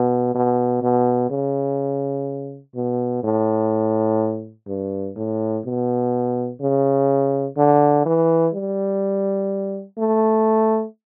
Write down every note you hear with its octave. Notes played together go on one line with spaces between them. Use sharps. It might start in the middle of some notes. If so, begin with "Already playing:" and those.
Already playing: B2
B2
B2
C#3
B2
A2
G2
A2
B2
C#3
D3
E3
G3
A3